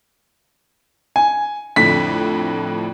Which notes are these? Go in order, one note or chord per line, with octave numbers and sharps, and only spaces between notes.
G#5
F2 A2 D3 B6